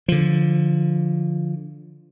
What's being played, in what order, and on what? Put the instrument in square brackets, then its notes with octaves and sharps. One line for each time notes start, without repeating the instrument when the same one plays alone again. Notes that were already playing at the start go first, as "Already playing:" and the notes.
[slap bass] D3 F3